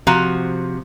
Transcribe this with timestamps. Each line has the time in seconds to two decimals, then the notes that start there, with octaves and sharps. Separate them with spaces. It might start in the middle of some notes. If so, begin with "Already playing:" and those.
0.07 C3 F3 F#4 A#5